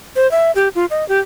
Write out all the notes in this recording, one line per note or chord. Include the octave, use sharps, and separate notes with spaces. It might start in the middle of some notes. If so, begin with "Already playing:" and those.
C5
E5
G4
F4
D#5
G4